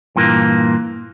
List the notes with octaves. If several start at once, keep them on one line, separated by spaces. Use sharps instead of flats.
G2 A#2 E3 A#3